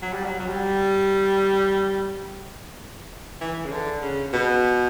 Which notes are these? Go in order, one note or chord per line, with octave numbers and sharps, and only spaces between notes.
F#3
G3
F#3
F#3
G3
E3
C#3
D3
C#3
B2